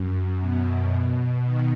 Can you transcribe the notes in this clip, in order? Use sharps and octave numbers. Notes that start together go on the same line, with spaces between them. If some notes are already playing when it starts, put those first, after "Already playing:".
Already playing: F#2
B2
D#3